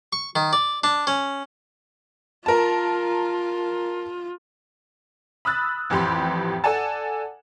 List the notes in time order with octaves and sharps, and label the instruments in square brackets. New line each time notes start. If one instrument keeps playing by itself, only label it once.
[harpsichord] C#6
D#3
D5
D4
C#4
[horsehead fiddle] F4 [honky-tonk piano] A#4 A5
[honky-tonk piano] B5 D#6 E6 F#6 A6
A1 F2 E3 G4 B5 C6
A4 D5 F#5 G#5 A5